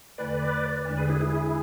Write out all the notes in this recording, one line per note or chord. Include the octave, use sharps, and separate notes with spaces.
E2 D3 A3 E4 A4 B4 D5
E2 D3 G#3 D4
G#4 B4
E4 G#4
E4 G#4